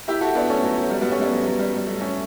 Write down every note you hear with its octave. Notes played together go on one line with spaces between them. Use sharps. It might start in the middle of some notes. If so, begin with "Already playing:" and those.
E4 G4
F#4 A4
B3 D4
A3 C#4
F#3 A3
F#3
G3
G3 B3
A3 C#4
G3 B3
F#3
F#3
G3
G3
F#3 A3
A3 C#4